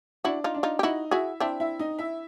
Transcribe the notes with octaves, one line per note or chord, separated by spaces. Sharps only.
D4 E4 F#4 D5
D#4 F4
D4 D5
D#4 F4
G4
D#4 E4 F#4 D#5
E4 F#4 G#4 E5
C4 D4 E4 E5
E4 E5
D#4 D#5
E4 E5